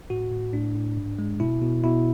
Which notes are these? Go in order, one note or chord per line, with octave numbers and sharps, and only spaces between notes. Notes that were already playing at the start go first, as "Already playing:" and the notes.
A2 F#4
A2
A2 D4
A2
G#2
G#3
B2 E4
B2
B2 E4